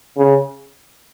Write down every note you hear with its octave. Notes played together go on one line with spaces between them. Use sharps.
C#3